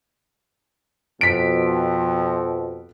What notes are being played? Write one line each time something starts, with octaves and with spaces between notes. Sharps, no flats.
F2 B2 B6 D7